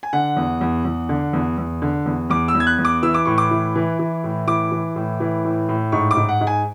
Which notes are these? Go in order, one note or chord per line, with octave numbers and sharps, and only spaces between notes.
G#5
D3 F#5
E2
E2
E2
D3
E2
E2
D3
E2
E2 D6
E6
E2
G#6
F#6
E2
D6
E3 E6
D6
A2 C#6
D6
E3
E3
E3
A2
E3 D6
E3
A2
E3
A2
A2
G#2 C#6
D6
G#2
F#5
G#2
G#5